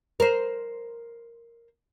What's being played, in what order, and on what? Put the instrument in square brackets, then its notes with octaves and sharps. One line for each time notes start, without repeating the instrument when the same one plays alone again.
[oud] A#4 C5